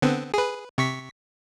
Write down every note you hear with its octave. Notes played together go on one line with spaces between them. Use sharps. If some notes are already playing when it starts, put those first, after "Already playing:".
D3 B3 C4
G#4 B4
C3 C#6 B6